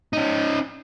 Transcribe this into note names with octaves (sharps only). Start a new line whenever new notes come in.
C#4 D#4